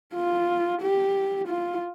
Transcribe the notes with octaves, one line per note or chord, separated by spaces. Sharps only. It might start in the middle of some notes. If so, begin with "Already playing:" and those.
F4
G4
F4